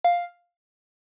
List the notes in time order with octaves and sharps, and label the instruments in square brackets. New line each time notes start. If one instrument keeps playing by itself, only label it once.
[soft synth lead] F5